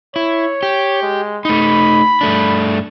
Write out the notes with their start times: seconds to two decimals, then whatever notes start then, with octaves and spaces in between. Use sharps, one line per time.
0.16 E4 C#5
0.63 G4
1.02 G#3
1.45 A3 D#4 B5
2.21 G2 A3 D4